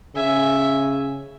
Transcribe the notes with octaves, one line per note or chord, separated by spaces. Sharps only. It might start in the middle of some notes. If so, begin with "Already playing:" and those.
C#3 E5 G#5